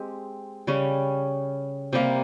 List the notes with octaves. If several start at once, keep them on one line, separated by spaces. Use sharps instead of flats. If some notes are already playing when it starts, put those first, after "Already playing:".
Already playing: G#3 C4 G4
C#3 G3 C#4
C3 G3 A#3